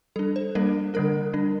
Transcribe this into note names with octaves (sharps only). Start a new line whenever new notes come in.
G3 D4 A4
C5
G3 A#3 D4 A#4
D3 G3 D4 A#4
G3 D4